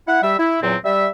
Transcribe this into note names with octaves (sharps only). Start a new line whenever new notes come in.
E4 F#5
G3 E5
E4
E2 A#2 F#3 C4
G3 E5